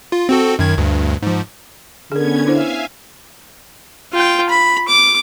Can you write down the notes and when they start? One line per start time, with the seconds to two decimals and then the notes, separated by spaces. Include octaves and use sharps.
0.12 F4
0.29 C4 F#4 A4
0.59 F#2 D#3 G#6
0.78 D2 G2
1.22 G#2 F3
2.12 D3 B3 C#4 G#4 A#4 G#6
2.46 D4 E4 C5 E5 F5 G#5
4.13 F4 G5
4.50 B5
4.88 D6